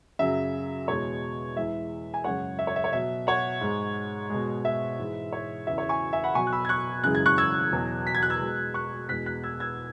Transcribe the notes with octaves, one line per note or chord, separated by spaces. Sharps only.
F#2 C#3 F#3 E5
E2 B2 G#3 C#5
E2 E3 G#3 E5
G#5
F#2 C#3 G#3 C#5 F#5
E5
C#5
E5
C#5
B2 F#3 E5
C#5 F#5
G#2 G#3
B2 G#3
E5
G#2 E3 G#3
C#5
E2 C#3 E3 E5
C#5
G#5 C#6
E5 G#5
F#5 B5
B2 F#3 G#5 C#6
F#6
B5 E6
G#6
C#6 F#6
F#2 C#3 E3 G#3 F#6
G#6
C#6 F#6
E6 G#6
E2 B2 F#3
B6
G#6
F#6
E6 G#6
B2 G#3
C#6 F#6
E2 B2 G#3 F#6 B6
F#6 B6
E6 G#6
E6 G#6